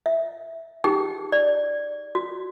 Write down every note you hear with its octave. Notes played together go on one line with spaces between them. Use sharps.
E5
D#4 G4 G#4 G5
D5
F#4